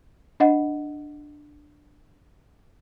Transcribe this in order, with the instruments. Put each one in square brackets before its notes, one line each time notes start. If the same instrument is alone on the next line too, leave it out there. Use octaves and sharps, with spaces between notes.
[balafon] D4 D#5 F#5